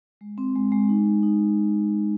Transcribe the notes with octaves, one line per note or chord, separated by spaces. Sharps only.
G#3
C4
G#3
G#3
D#4
D#4
D#4